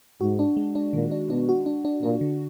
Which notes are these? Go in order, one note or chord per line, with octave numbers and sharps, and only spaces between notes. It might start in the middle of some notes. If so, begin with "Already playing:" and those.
G#2 F#4
D4
G#3
D4
A#2 D#3
D4
B2 D4
F#4
D4
D4
A#2 D4
D3